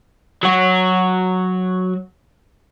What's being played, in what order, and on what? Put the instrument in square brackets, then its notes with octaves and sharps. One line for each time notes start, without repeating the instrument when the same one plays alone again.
[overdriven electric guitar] F#3 F#4